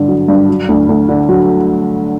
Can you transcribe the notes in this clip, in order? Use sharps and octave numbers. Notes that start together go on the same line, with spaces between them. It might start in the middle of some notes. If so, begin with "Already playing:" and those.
Already playing: G2 D3
F#3
G2
F#3
D2
D2
D3
F#3